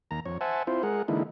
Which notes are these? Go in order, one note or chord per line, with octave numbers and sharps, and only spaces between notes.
D#2 A#5
F2 C#5
C5 E5 F#5 G#5 A5
C4 E4 F4 C5
G#3 G#4 A#4 F#5
D3 E3 G#3 A#3 D#4 E4